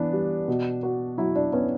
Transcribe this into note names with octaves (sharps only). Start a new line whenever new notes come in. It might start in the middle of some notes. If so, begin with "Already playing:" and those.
Already playing: E3 B3 D4
G3
B2
F#4
F#3 E4
D4
B3 C#4